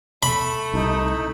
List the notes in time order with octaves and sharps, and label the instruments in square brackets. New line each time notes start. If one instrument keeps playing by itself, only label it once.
[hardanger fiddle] A3 [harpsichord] B5
[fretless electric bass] C2 [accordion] D#4